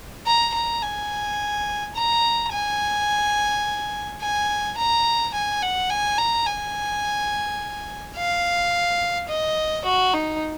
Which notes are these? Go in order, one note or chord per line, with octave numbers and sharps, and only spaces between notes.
A#5
A#5
G#5
A#5
G#5
G#5
A#5
G#5
F#5
G#5
A#5
G#5
F5
D#5
F#4
D#4